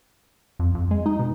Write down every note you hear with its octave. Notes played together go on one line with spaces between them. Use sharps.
F2
F2
G#3
D#4
B2